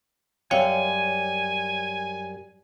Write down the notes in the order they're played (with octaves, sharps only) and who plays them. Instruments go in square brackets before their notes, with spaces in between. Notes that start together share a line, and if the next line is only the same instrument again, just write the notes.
[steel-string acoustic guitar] F#2 G3 [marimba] C#5 F5 G5 [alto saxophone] G#5